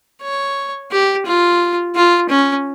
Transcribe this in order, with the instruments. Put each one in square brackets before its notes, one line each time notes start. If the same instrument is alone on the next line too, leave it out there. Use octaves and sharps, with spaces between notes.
[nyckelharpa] C#5
G4
F4
F4
C#4